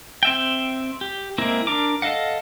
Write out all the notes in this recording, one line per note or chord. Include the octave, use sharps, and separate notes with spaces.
C4 E5 G5
G4
G#3 A#3 C4 E4 A#4
D4 A#4 A#5 D6
A4 D#5 F5 F#5